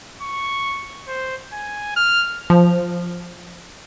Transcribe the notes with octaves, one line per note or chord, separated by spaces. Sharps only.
C#6
C5
G#5
F6
F3